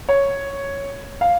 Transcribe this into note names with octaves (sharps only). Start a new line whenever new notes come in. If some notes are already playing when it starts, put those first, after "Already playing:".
C#5
F5